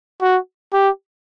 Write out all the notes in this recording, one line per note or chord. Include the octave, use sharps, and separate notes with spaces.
F#4
G4